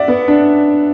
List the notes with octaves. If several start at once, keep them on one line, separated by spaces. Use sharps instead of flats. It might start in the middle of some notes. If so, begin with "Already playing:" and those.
Already playing: D5 E5 F#5
B3
D4